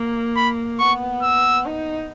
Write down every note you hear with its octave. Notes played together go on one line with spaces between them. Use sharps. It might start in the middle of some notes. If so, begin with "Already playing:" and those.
Already playing: A#3
B5
B3 C#6
E6
D#4